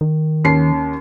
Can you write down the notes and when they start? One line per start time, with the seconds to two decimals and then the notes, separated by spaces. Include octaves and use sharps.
0.01 D#3
0.44 D#2 C#4 C7